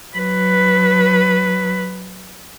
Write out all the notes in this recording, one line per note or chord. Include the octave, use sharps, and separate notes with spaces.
F#3 B4